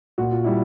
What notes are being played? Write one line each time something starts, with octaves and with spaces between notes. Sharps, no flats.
A#2 F#4
F4
G3 E4